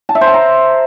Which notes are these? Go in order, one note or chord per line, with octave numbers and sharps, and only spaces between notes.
A5
E5
C5
A5
A#5